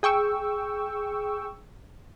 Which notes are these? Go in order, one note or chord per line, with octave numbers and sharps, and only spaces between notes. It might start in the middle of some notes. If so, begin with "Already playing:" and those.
G#4 G5 C#6 E6